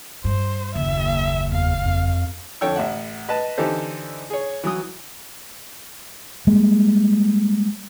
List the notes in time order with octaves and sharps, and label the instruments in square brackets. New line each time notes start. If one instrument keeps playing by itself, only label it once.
[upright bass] G2 [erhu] C5
[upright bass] F#1 D#2 [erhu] E5
[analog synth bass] E2 [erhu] F5
[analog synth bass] F2
[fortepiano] F2 D3 A4 C#5 G5 E6
A1 E5 F#5
B4 D#5 A5
D3 E3 D#4 G4 A4 C5
G#4 C#5
E3 F#3 D#6
[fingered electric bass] G3 G#3 A#3